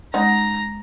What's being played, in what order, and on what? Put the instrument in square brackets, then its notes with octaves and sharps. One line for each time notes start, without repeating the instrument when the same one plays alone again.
[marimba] G#3 C#4 [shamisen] D#4 F#5 [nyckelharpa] A#5